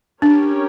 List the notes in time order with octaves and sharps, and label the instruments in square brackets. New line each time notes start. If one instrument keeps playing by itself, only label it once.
[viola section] C#4 G4 A#4 C#5 [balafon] D4